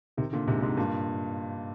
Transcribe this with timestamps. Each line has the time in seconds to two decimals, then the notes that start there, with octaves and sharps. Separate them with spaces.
0.17 C3 D#3
0.33 A#2 D3
0.48 G#2 C3
0.62 G#2 C3
0.77 G2 A#2